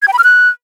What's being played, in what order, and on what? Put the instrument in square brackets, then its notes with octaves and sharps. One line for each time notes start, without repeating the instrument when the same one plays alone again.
[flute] G#6
G5
B5
F6
F#6